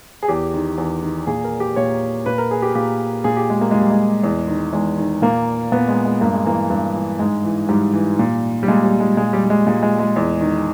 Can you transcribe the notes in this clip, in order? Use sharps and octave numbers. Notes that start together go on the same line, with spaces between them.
G#4
E2 G4
D#3
E2
D#3
A#2 G#4
A#4
G4
A#2 C#5
A#2 B4
A#4
G#4
G4
A#2 G4
A#2 G#4
G4
G#3
A#3
A#2 G#3
G3
G#3
E2
D#3
E2 G#3
D#3
A#2 A#3
A#2 B3
G#3
G#3
G2 A#3
G#3
E3 A#3
G2
E3
G#2 G#3
E3
G#2 G3
E3
A#2
G3
A#2 G#3
G3
G#3
A#2 G#3
G3
G3
G#3
A#2 G#3
G#3
G#3
E2
D#3